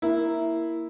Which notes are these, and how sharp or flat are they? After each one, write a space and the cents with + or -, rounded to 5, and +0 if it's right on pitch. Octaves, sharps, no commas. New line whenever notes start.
A#3 +0 E4 +0